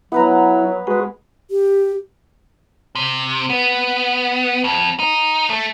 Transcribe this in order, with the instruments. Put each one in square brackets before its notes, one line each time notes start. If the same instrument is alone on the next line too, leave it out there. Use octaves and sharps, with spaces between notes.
[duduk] F#3 [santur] B3 B4 A#5 [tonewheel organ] E4
[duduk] G#3 [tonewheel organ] F#4 G#4 B4
[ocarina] G4
[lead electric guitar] C3
B3
F2
D#4
A3